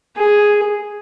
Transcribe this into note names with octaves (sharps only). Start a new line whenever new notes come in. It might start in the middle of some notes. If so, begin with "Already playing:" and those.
G#4